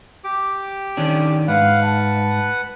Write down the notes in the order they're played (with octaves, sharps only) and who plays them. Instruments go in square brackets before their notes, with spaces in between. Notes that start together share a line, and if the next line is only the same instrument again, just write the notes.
[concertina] G4 D6
[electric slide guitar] D#3 C#4 D4
[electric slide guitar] G#2 [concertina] B4 F#5 [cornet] F5
[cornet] A5